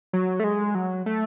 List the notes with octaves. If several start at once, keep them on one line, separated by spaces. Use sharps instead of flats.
F#3
A3
G#3
F#3
A3